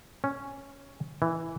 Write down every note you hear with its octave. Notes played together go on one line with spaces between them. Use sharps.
C#4
E3